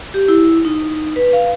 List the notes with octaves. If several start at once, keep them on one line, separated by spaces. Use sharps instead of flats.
G4
E4
D#4
B4
F5